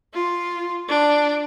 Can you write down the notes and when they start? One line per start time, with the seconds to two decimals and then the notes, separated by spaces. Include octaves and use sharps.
0.14 F4
0.88 D4